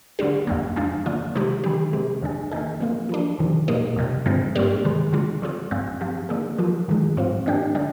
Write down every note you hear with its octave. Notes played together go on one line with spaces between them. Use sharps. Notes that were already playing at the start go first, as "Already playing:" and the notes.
D3 G3 D4 G4
F2 D3 G3 A#3
F3 G#3 D4
D3 F3 A#3 F4
C3 D#3 G#3 D#4 G4
D#3 G3 D4 G4
C3 D#3 G#3 C4 G4
F2 D3 G#3 D4 G#4
D#3 A#3 D#4 G#4
F3 A#3 F4
F3 A#3 D4
F2 C3 D#3
A#2 G3 A#3 D#4
F2 C3 G3
G2 D3 F3 G#3 C4
G#2 G3 A#3 D4 G4
C3 D#3 G#3
D3 G#3 D4 F4 G#4
D3 F3 C4 F4 G#4
G2 F3 G#3 C4
F3 C4 G4
D3 F3 A#3 D#4 G#4
F3 A#3 F4
G2 D#3 G#3
G#2 F3 C4 F4
D#3 A#3 D4 G4
D3 G3 D4